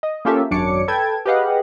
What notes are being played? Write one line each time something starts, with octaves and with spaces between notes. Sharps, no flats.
D#5
A#3 C#4 F4 G4 A4 E5
G#1 F#2 D4 C#5 D6 C#7
A4 B4 G5 A5 G#6
G4 G#4 B4 D#5 F5 F#5